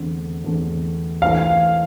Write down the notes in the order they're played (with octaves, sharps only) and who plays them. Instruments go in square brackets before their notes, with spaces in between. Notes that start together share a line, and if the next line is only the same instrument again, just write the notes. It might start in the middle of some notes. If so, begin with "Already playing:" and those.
Already playing: [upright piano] E2 D3 A3 C4
E2 D3 A3 C4
[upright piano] E3 A3 D4 A4 C5 [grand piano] F5